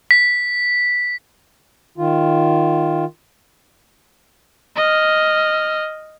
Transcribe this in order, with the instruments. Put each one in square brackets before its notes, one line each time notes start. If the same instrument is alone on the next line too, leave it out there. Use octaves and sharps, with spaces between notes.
[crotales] B6
[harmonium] D#3 F4
[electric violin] D#5 F6